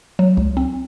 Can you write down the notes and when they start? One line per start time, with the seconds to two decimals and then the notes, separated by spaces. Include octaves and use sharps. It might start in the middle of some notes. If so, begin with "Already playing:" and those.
0.19 F#3
0.37 C#2
0.57 C4